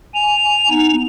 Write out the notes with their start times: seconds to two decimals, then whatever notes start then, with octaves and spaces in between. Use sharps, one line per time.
0.14 G#5 F7
0.70 B3 D#4